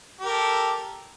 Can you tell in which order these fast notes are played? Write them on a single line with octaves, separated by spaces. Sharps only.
G4 A#4 A4